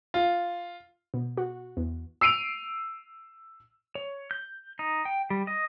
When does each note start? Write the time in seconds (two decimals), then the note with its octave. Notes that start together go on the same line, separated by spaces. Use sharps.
0.14 F4
1.14 B2
1.37 F#4
1.77 E2
2.21 E6 C7 D7 D#7 F7
3.95 C#5
4.31 G6
4.79 D#4
5.05 G5
5.30 G3
5.47 D#5